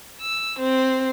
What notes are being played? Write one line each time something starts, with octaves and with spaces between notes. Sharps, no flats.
E6
C4